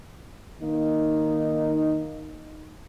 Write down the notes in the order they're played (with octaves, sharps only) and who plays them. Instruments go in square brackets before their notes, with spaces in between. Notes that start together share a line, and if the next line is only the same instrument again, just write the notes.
[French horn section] D#3 A#3 D#4